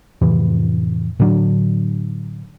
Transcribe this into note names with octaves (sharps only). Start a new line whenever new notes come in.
F2 A2 C3 E3
A2 D3 F#3 D4